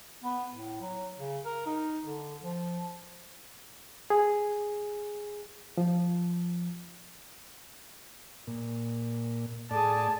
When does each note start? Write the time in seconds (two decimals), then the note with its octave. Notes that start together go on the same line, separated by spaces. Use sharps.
0.24 B3
0.53 A2
0.81 F#3
1.18 C#3
1.45 A#4
1.66 D#4
2.05 D3
2.42 F3
4.10 G#4
5.77 F3
8.47 A#2
9.71 A2 G#4 D5 A5